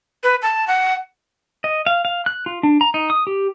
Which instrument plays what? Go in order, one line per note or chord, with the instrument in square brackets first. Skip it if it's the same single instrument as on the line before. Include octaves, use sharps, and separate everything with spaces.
[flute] B4
A5
F#5
[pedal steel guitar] D#5
F5
F5
F#6
F4
D4
A#5
D#4
D#6
G4